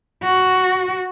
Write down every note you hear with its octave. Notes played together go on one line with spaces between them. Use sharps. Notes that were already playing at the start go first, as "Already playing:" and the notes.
F#4